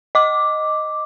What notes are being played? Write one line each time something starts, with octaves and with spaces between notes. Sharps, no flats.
D#5 D6